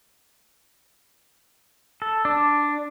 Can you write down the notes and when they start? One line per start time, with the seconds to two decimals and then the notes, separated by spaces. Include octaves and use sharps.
2.02 A4
2.25 D4